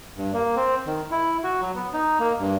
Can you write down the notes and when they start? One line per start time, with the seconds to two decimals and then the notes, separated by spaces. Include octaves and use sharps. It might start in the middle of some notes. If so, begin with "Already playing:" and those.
0.17 G2
0.34 A#3
0.56 C4
0.87 D#3
1.11 E4
1.44 F#4
1.61 F#3
1.75 B3
1.94 D#4
2.20 A#3
2.39 G2